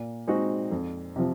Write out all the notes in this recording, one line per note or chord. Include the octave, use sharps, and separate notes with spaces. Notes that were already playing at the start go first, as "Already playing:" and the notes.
Already playing: A#2
G#3 C4 D#4 F#4
F2
C3 F3